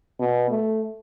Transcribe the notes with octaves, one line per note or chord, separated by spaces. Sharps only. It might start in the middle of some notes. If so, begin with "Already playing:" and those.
B2
A3